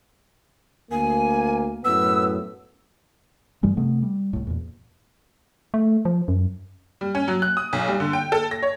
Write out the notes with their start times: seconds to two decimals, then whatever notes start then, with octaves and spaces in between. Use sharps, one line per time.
0.91 D2 A#3 G#5
1.85 F#2 A2 B3 E6
3.63 G2 E3 G3 G#3
3.77 C3 A3 B3
4.02 G3
4.33 C2 A2
4.47 E2 A#2
5.74 A3
6.05 F3
6.28 F#2
7.01 G3
7.15 C#4
7.28 F#3
7.42 F#6
7.57 D#6
7.73 B1
7.88 G3
8.00 D3
8.13 G5
8.32 A4
8.51 A#6
8.63 C#5